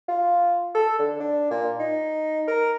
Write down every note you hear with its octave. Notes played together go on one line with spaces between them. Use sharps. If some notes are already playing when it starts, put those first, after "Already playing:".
F4
A4
D3
D4
A#2
D#4
A#4